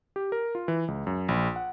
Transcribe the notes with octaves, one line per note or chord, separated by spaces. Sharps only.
G4
A#4
F4
E3
C#2
F#2
A#1
F#5